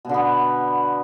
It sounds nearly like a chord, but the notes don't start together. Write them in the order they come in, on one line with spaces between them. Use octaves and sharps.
B2 D3 B3